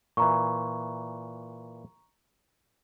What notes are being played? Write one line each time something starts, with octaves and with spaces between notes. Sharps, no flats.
A#2 E3 A#5 C#6